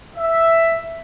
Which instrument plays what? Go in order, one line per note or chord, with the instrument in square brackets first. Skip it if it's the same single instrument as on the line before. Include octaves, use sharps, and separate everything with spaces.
[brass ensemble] E5